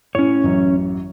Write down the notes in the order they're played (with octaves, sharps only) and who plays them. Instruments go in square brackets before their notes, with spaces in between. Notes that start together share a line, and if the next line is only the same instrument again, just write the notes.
[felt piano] A2 [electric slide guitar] C#4 C#5
[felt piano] A1 F#2